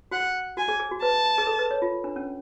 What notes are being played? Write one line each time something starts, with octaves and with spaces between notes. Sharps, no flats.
F#4 F#5
F#4 G#5
G#4
G#4
F#4
B4 A5
G#4
A4
B4
C#5
F4
D4
C#4